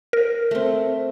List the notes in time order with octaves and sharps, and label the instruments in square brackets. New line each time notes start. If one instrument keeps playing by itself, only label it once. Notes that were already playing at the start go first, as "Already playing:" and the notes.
[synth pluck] A#4
[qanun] A3 C4